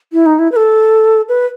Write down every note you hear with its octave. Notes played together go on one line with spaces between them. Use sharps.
E4
D#4
E4
B4
A4
B4